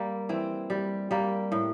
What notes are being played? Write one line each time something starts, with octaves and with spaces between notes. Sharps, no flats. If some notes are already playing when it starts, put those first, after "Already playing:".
Already playing: G3 A#3
E3 C4
G3
G3 A#3
A2